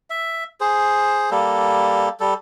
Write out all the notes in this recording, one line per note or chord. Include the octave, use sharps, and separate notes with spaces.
E5
G#4 C5
G3 A#3 A4
G3 A4